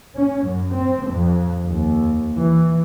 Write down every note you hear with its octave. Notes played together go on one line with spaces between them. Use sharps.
C#4
F#2
C4
F2
D#2
E3